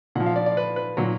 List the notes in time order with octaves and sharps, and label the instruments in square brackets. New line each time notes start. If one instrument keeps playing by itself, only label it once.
[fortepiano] A#2 F#5
F3
F5
D5
D5
B4
B4
A#2 F#3